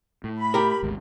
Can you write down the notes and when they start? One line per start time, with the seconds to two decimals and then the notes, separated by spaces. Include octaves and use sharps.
0.24 A2
0.38 B5
0.54 G4 A#4
0.83 G#1 D2 G#2